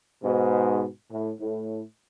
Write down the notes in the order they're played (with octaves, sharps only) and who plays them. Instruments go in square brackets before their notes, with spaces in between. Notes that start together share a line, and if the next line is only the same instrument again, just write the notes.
[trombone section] G#2 B2
A2
A2